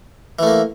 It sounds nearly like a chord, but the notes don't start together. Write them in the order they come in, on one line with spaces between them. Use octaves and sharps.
E3 A3 A#3